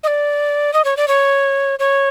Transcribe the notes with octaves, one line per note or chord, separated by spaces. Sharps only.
D#5
D5
D#5
C#5
D5
C#5
C#5